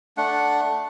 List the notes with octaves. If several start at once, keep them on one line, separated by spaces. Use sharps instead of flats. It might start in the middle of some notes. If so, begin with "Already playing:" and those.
A3 D4 F#5